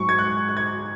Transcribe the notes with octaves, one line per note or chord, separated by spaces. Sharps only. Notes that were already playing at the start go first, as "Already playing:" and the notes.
Already playing: G#2 F#3 C#6
G#6
F#6
F#6
G#6